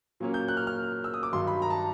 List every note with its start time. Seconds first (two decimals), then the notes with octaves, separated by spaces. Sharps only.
0.20 A#2 F#3 A#3 C#4
0.34 G6
0.48 F#6
0.57 F6
0.67 F6
1.04 E6
1.14 D#6
1.23 D6
1.33 G2 D#3 F#3 C6
1.47 B5
1.62 A#5
1.70 A5